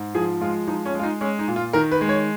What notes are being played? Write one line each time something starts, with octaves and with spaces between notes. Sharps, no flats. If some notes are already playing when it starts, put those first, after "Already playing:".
Already playing: G#2
F3 G#4
G#3 F4
F3 D#4
C#4
G#3
F4
D#4
G#3 C#4
D#4
A#2
F4
D#3 A#4
B4
G#3
C#5